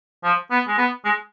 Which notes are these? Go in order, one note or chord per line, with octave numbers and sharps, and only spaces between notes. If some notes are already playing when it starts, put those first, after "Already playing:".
F3
B3
G#3
B3
G#3